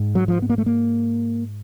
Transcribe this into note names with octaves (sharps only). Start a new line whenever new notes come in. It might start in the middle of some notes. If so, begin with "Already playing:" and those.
Already playing: G#2
F#3
F3
B3
A#3
A3
A#3